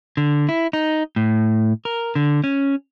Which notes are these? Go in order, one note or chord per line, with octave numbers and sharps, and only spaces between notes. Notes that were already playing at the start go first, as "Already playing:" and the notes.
D3
E4
D#4
A2
A#4
D3
C#4